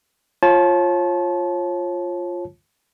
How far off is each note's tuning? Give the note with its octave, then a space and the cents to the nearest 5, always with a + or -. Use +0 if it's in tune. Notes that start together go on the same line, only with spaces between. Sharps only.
F4 +0 C#5 -35 A5 -25